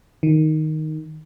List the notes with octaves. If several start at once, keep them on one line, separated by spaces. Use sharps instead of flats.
D#3